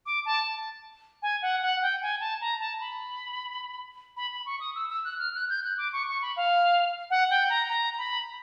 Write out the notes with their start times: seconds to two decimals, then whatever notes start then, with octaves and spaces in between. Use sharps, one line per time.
0.06 D6
0.25 A5
1.22 G#5
1.42 F#5
1.62 F#5
1.82 G5
2.02 G#5
2.20 A5
2.41 A#5
2.60 A5
2.80 B5
4.17 B5
4.31 B5
4.46 C#6
4.60 D#6
4.75 E6
4.89 E6
5.05 F#6
5.19 F6
5.35 F#6
5.49 G6
5.64 F#6
5.78 D6
5.93 C#6
6.08 C#6
6.22 B5
6.36 F5
7.10 F#5
7.30 G5
7.50 A#5
7.69 A#5
7.98 B5